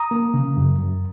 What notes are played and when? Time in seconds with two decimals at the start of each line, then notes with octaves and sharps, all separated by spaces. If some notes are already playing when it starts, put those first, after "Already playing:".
Already playing: A#5 D#6
0.11 A#3
0.34 C#3
0.57 F#2
0.79 F#2